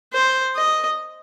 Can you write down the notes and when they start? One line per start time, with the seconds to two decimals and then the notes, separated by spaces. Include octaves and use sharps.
0.13 C5
0.56 D#5